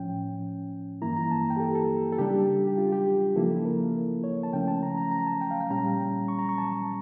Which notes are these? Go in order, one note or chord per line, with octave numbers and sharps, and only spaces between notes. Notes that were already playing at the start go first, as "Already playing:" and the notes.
Already playing: A2 F3 C#4 G5
G2 E3 A#3 E4 A#5
A#5
A5
G5
G4
A4
A4
A4
C#3 G3 D4 G4
G4
F4
G4
C#3 F3 A#3 E4 A4
A#4
C#5
A5
C#3 F3 A3 C#4 G5
A5
A#5
A#5
A#5
A5
G5
F5
G5
A#2 G3 C#4 A#5
C#6
A#5
C#6
A5